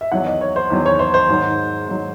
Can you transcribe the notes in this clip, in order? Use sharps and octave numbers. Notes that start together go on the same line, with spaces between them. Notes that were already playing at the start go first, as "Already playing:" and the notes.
E5
E2 D#3 F#3 F#5
D#5
C#5
C5
E2 D#3 F#3
C#5
C5
C5
G#2 D#3 F#3
G#2 D#3 F#3